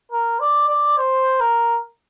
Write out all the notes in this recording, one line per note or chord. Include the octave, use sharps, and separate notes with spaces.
A#4
D5
D5
C5
A#4